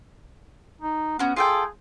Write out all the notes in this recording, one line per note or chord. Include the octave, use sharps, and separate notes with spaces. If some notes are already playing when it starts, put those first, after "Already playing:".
D#4
B3 C#4 F#4
F4 G#4 A4 G5